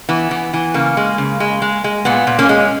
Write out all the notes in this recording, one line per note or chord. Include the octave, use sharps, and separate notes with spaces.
E3 B3
E3
E3
C#3 A#3
G#3
C#3
G#3
G#3
G#3
A#2 B3
A#2
A#3 C#4
G#3